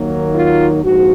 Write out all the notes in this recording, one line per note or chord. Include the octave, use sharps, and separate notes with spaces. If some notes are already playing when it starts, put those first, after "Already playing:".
Already playing: D#2 D#3 F#3 A#3 D#4
F4
A#1 G#2 F3 F#4